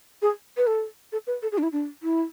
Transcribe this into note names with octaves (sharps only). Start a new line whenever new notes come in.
G#4
B4
A4
A4
B4
A4
G#4
D4
E4
D4
E4